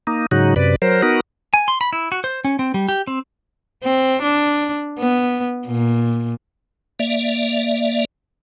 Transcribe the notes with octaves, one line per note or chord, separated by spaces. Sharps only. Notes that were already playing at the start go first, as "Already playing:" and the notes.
A#3 D#4
G#2 C#3 F#3 D#4 F#4
F#2 C3 B4 D5
F#3 A#4 C5
B3 D#4 F#4 A#4
G#5
C6
B5
E4
F#4
C5
C#4
C4
G3
G4
C4
C4
D4
B3
A#2
A#3 D5 E5